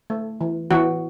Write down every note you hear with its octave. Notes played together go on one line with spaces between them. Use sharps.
A3
E3
E3 F#4